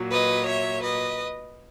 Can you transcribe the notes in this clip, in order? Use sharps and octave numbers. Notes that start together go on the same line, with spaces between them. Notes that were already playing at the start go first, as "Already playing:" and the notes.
Already playing: A#2 F#3
B4 D#5
C#5 E5
B4 D#5